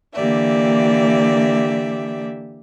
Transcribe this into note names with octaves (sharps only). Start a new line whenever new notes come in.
D3 E3 A#3 G4 D5 E5